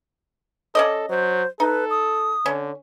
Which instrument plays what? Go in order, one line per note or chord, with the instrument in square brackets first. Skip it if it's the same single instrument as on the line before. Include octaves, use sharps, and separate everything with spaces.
[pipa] C#4 D5 D#5 [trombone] A4
[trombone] F#3 [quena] C5
[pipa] D#4 [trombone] A4 [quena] B4
[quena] D#6
[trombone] D3 [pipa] C#4